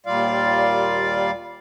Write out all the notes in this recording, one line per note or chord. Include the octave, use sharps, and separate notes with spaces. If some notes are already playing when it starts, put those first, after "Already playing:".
D#2 A#2 G3 F4 D5 F5